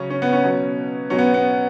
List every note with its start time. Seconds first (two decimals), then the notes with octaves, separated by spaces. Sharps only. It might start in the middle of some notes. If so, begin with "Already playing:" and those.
Already playing: C#3 F#3 C#4
0.10 C#4
0.22 B3
0.33 C#4
0.44 B2 F#3
1.10 B2 F#3 C#4
1.19 B3
1.34 B3